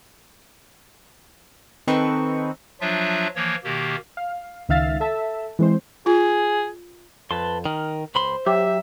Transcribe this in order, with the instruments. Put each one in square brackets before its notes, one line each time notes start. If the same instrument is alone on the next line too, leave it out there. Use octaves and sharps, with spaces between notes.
[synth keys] D#3 C4 D#4 A4 B4 C#6
[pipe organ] F3 F#3 D4 F4 E5
E3 F3 A#3 C#5
B2 D#3 A#3 G4
[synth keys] F5
C#2 D#3 E5 F5 A6
A4 E5 A5
E3 G#3 C4 C5
[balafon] F4 [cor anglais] G#4
[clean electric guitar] F2 [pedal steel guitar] B4 A5 C6
[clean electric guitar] D#3 [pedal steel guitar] A#4
[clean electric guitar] C#2 B5 C6 [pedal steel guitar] C5
[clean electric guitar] F#3 [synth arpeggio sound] G4 [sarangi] E5